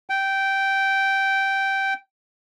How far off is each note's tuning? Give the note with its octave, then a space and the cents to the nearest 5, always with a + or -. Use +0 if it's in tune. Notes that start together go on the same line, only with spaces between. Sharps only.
G5 -10